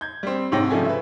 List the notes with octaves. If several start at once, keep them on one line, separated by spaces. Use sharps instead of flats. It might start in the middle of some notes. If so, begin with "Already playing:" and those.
G6 G#6
G3 C4
G#2 C3 C#5 G5 A#6
C#3 F3 G3 A3 F4 G#5
B4 E5